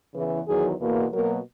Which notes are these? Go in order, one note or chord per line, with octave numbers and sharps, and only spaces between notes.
E2 C#3 E3
E2 D#3 F#3 G#4
E2 B2 A#3
B2 F#3 A#3 A#4